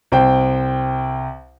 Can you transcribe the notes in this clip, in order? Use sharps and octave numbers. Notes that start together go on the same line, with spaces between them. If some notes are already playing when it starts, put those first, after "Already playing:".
C2 C5 G5